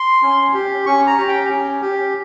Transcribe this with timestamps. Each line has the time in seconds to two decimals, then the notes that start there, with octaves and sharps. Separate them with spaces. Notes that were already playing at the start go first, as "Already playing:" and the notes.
Already playing: C6
0.22 C#4
0.54 G4
0.86 C#4 C#6
1.07 A#5
1.18 G4
1.28 G5
1.49 C#4
1.82 G4